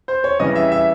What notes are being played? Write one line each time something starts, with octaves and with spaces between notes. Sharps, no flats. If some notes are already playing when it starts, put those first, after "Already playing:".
C5
C#5
C#3 E3 G3 D#5
E5
E5